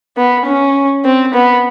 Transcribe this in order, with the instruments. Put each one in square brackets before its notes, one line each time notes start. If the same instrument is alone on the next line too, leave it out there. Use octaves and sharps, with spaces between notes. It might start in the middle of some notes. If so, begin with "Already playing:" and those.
[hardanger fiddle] B3
C#4
C4
B3